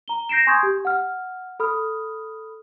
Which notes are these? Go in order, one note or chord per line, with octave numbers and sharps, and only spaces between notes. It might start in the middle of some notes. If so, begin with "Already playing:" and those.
A#5 G7
G6 A#6 C7 D7 E7
G#5 C6 C#6 D#6 G6 G#6
G4
F#5 F6
A4 B5 D#6 F6